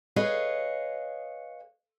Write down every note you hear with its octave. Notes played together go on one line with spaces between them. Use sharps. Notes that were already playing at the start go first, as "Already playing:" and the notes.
G#4 B4 C#5 D#5 F5